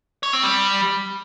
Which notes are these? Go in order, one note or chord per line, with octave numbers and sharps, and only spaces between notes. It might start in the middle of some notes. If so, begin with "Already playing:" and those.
C#5
C4
G3